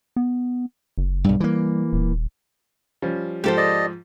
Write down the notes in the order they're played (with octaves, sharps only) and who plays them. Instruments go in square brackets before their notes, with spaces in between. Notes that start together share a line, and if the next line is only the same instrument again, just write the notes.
[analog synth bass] B3
F#1
[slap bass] B1 G2 [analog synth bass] G3
[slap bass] E3 A#3
[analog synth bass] D#1
[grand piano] F3 G3 C#4
[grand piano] G#2 F3 [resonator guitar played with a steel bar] G4 A4 C5
[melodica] D5 D#5